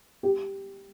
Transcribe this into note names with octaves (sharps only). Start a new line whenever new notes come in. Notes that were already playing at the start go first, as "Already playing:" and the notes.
G4